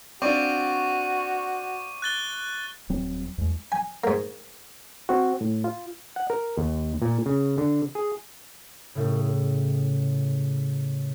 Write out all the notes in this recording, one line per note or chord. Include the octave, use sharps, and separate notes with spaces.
C4 D4 F4 F#4 C#6 D6 D#7
F#6 A6 G7
D#1 F#3 C4
E2 G#3
G#5
G#2 A#3
C4 F#4
A2
F4
F#5
A#4
D#2
A#2
C#3
D3
G#4
A2 C#3